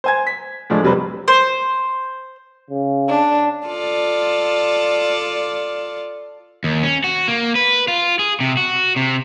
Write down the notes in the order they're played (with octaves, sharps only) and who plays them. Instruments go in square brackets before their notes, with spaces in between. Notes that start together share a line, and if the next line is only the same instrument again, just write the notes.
[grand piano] C5 G#5 G#6
B6
A2 F3 G#3 D4
F1 C3 F#3 G3 B4 C5
[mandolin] C5
[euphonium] C#3
[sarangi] D4
[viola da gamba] F4 A4 D5
[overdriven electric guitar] D#2
C#4
F#4
A#3
B4
F4
G#4
C3
F#4
C3